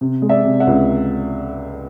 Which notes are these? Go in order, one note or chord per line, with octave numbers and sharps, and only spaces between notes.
C3
G#3
D5 E5
C3
E5 F#5
C#2